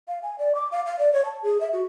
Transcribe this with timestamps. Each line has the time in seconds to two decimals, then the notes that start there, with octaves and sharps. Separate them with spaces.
0.08 F5
0.23 G#5
0.39 D5
0.55 D6
0.72 F5
0.86 F5
0.99 D5
1.13 C#5
1.25 A5
1.42 G#4
1.60 E5
1.73 F#4